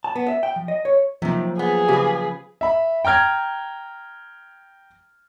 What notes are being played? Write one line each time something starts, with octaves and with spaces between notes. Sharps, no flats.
A5
B3
E5
G5
F3
D#5
C#5
C3 D#3 F3 F#3 A#3
B3 G#4
C#3 G4 B4
E5 B5
G5 A#5 F6 G#6